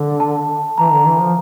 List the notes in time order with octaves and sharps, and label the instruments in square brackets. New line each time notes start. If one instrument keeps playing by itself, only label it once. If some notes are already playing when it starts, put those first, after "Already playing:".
Already playing: [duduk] D3
[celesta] A5
[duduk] E3 [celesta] A#5
[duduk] D3
E3
F3